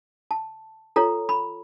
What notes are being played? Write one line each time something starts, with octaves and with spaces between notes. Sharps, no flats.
A5
F4 A4 C#5 A#5
B5